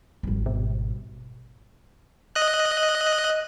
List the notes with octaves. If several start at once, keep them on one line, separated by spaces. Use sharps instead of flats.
G#1 G3
B2
D#5 F#6